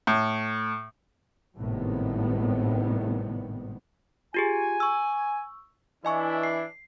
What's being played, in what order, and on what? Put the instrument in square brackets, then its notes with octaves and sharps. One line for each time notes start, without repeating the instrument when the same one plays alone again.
[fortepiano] A2
[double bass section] G#1 A2 C3 D#3 G3 B3
[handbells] F4 G4 G#4 [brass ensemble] G#5
[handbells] C#6 E6
[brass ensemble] E3 D4 E4 [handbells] D#5 G#5 C#6
[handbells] C7